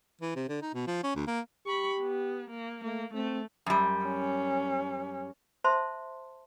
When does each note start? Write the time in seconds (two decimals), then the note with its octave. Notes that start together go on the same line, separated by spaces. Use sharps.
0.21 E3
0.36 C3
0.49 D3
0.62 D#4
0.74 B2
0.87 F3
1.04 C#4
1.16 D2
1.27 A#3
1.66 G4 B5 C#6
2.01 B3
2.50 A#3
2.84 A3 A#3
3.14 A3 C4
3.66 F#2 G3
4.04 C#4
5.64 C5 E5 A5 C6